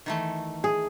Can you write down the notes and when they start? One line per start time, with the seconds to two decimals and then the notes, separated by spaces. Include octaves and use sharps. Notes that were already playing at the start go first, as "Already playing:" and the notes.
0.06 D#3 E3 A3
0.64 G#4